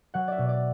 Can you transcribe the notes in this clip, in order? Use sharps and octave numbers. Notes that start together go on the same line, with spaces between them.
F#3 F#5
D5 E5
B2
D5